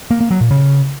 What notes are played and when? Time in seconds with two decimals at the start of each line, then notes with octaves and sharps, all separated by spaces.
0.11 A#3
0.21 A#3
0.31 F#3
0.41 A#2
0.51 C#3